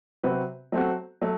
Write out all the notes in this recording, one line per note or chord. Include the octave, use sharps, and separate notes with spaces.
C3 F#3 C4 F#4 B4
F#3 A3 C4 F#4
F#3 A3